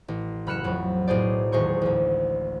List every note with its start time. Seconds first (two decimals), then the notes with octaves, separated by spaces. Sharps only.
0.08 A1
0.47 F#1 B5 F6 F#6 C#7 E7
0.64 F2 F#3
1.07 B1 A2 G#4 C5 D5
1.52 D#1 E2 G#3 C5 C#6
1.81 A1 D2